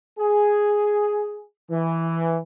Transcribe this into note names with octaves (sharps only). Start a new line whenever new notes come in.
G#4
E3